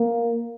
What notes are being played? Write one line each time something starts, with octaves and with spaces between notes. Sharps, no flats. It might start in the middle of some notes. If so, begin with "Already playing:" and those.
Already playing: A#3